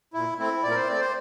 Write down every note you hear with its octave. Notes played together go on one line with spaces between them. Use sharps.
A#2 E4
A3 C4 E4
A#2 D5
A#4
C5
A3 C4 D5
C5